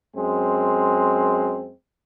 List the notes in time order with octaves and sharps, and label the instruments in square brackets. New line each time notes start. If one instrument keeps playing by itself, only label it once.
[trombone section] F#2 G#3 C4